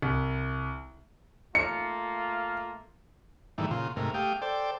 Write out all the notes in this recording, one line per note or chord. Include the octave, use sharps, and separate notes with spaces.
C2
A3 A#3 F4 C#7
G#2 D#3 E3 G3 A3
A#2 C#3 F4 C6
G#2 C3 A3 A#4
A3 G4 F5 G5 D#6
A4 C5 D5 G5